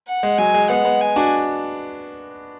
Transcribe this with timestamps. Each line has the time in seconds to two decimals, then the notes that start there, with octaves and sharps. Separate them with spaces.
0.08 F#5
0.23 G#3
0.38 F#3 G#5
0.54 G#3
0.70 G#3 B3 F#5
0.85 G#3 B3
1.01 G#5
1.16 D4 F#4